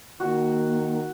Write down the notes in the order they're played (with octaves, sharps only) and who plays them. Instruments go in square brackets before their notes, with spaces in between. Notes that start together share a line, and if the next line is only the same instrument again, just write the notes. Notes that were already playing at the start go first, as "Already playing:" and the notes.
[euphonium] D#3 [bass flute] A#3 [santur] F#4